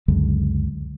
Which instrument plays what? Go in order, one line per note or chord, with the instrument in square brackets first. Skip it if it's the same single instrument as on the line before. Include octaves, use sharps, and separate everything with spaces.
[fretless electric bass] C#2 F#2 D3 G#3